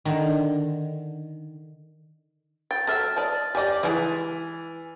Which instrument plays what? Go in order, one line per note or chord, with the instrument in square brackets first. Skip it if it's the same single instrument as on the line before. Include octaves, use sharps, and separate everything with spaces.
[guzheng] D3 D#3
[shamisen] G5 [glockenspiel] A6
[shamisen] F#3 A4 E5 [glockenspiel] F6 A6
[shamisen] D5 D#5 A5
[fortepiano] G4 D5 [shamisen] D#5 G#5
[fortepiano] E3 [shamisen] G#3 E4